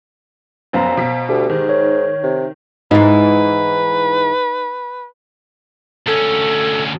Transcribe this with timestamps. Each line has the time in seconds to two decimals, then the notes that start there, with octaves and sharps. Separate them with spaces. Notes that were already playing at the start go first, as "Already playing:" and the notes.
0.73 F1 F#2 B3 C5 F5 A#5
0.97 B2 B6
1.29 D2 G4
1.50 G#2 D#3
1.69 C#5
2.23 C3
2.91 G#2 E3 D#4 B4
6.07 D2 C#4 A4